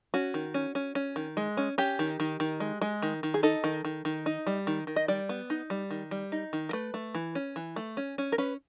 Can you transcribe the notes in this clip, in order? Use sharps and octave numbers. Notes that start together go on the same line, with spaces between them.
C#4 F#4
D#3
C#4
C#4
C#4
D#3
G#3
C#4
C#4 G4
D#3
D#3
D#3
G#3
G#3
D#3
D#3
G#4
D#4 A4
D#3
D#3
D#3
D#4
G3
D#3
D#3
D#5
G3 D5
B3
D#4
G3
D#3
G3
D#4
D#3
A#4
A3 B4
A3
E3
C#4
E3
A3
C#4
C#4
A#4
C#4 B4